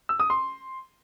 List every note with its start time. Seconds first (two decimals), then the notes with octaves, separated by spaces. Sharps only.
0.09 E6
0.20 D#6
0.30 C6